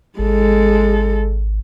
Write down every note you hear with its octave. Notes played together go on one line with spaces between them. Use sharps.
G#1 G#3 A4